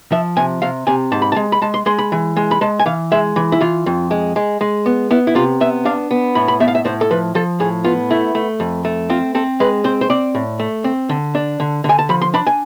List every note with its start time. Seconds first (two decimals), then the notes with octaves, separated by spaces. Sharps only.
0.12 F3 E5
0.37 C3 G#5
0.62 C3 F5
0.87 C3 G#5
1.12 G#2 A5
1.22 B5
1.32 A5
1.36 G#3
1.52 B5
1.62 G#3 A5
1.74 C6
1.86 G#3 C6
1.98 B5
2.12 E3
2.37 G#3
2.51 B5
2.61 G#3 A5
2.79 G#5
2.86 E3 F5
3.12 G#3 E5
3.36 E3
3.52 E4
3.61 E3 F4
3.86 F2
4.11 G#3
4.36 G#3
4.61 G#3
4.86 B3
5.11 B3 E4
5.27 E4
5.35 C3 F4
5.60 B3 E5
5.85 D4 F5
6.11 B3
6.35 A2 B5
6.48 B5
6.60 B3 E5
6.68 F5
6.75 E5
6.85 A2 C5
7.01 A4
7.11 F3 B4
7.35 F3 A4
7.60 A2 G#4
7.85 B3 F4
8.11 A3 E4
8.35 A3
8.60 F2
8.85 A3
9.10 C4 F4
9.35 C4 A4
9.60 G#3 B4
9.84 C4 C5
10.01 C5
10.10 C4 D5
10.35 A2
10.59 A3
10.84 C4
11.09 D3
11.35 D4
11.60 D3
11.84 D3
11.89 G#5
11.99 A5
12.09 F3 B5
12.22 C6
12.34 D4 B5
12.47 G#5